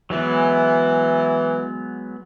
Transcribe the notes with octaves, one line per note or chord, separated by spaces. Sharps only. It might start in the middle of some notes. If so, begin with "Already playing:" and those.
E3 F#3 G#3 B3